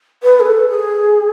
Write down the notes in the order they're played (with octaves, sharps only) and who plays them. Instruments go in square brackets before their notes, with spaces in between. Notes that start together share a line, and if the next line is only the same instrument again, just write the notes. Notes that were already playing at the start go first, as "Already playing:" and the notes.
[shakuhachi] B4
G#4
A4
G#4